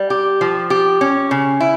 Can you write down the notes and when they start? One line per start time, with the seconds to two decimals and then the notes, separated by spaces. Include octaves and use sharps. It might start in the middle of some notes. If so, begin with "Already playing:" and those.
Already playing: G3
0.10 G4
0.41 F3
0.70 G4
1.01 C#4
1.31 C#3
1.61 E4